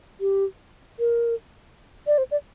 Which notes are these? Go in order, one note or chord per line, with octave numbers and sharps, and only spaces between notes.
G4
A#4
D5
C5
D5